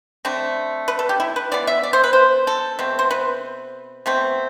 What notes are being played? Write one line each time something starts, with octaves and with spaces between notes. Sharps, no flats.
D3 A3 C4
B4
A4
G4
E4
B4
E3 B3 D5
E5
D5
C5
B4
C5
A4
B2 A3 C4
C5
B4
B2 A3 C4